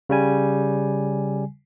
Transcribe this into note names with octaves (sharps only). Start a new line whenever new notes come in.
C#3 G3 G#5